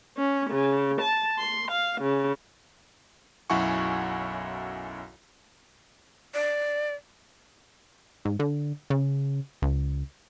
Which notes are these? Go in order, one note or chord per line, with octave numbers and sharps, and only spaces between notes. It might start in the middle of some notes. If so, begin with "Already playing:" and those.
C#4
C#3
A5
C6
F5
C#3
B1 F#2 E4 F#5 G#5 C#6
D5
G#2
D3
C#3
C#2